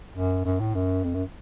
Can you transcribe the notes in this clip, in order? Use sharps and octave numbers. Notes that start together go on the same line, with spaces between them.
F#2
F#2
A2
F#2
F2
F#2